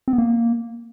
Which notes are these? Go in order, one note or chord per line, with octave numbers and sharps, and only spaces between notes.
C4
B3
A#3